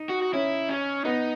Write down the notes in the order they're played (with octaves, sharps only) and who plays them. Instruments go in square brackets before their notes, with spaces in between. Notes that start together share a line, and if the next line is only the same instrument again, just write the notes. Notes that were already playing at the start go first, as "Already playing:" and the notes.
Already playing: [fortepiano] D#4
[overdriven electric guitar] F#4
F#4
[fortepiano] C#4 [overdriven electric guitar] E4
[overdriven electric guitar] C#4
[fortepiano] B3 [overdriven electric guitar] D#4